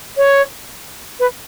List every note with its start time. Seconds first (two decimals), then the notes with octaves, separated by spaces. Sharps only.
0.17 C#5
1.20 B4